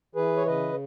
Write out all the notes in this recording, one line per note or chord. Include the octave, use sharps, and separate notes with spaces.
E3 G#4 B4
C#5
C#3 B4 D#5